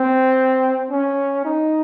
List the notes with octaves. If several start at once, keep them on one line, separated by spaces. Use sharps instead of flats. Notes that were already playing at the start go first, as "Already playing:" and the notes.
Already playing: C4
C#4
D#4